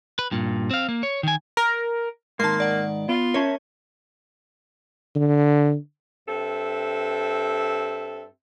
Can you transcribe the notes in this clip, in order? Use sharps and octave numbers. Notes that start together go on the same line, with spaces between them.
B4
G2 A#2
C4 F5
A#3
C#5
D#3 G#5
A#4
G#2 D#3 A#3 A5 C6
D5 F#5
B3 F4
C#4 A#4 C#5 E5 A5
D3
G2 C4 A4 E5